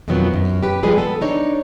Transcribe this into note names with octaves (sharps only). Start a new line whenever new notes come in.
F2 B2 D#3 F3 F#3 B3
F#2
G4 B4
F3 G3 G#3 G#4 B4
B3 A4
D4 D#4 C#5